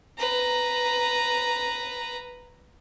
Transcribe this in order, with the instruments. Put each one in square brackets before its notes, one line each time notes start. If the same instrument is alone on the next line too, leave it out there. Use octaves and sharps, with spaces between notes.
[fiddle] B4 A#5